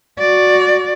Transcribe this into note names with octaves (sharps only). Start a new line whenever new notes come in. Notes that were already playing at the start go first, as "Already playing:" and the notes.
F#4 D5